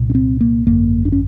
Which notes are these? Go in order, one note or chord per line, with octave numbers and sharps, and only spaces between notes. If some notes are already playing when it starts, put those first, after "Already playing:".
Already playing: C2 A#2
C#4
C4
A#3
G#1 F#2 D3 A#3
D4
C#4